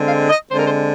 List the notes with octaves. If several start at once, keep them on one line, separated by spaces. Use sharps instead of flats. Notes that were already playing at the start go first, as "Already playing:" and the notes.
Already playing: D3 G#3 C4
F5
D#5
D3 G#3 C4 C5
A#4
C5